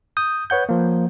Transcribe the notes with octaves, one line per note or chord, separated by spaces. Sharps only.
D#6 G6
B4 C#5 F#5 G6
F3 A#3